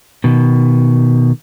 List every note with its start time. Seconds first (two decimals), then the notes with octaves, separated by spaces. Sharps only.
0.24 B2 D#3